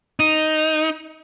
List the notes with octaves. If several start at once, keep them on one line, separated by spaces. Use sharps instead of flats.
D#4